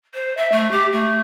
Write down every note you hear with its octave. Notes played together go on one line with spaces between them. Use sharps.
C5
E5
A3
G4
A3